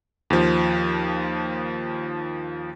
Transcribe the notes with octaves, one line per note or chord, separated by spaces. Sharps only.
D#2 F3